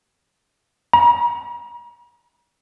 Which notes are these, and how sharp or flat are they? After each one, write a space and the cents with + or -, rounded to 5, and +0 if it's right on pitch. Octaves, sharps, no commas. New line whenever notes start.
A#5 +45